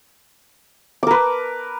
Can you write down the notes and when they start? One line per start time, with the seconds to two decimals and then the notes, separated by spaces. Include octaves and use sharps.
1.03 D6
1.07 A#4
1.11 B4